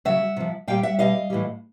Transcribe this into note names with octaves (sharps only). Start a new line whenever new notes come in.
C#3 F#3 E5 F#5
C3 F3
A#2 G3 F5 G5
E5 F#5
B2 G3 D#5 F5
A2 E3 G3